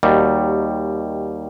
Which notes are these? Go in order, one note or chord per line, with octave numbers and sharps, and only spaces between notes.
D#2 D#3 G3 D#4 F#4